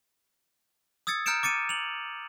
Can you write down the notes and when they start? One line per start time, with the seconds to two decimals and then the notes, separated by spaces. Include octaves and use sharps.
1.07 D#6 E6 G#6 A6 C#7
1.26 A#5 F6 G6 C#7 D7 E7
1.43 D6 A6 C#7 D#7
1.69 F7 F#7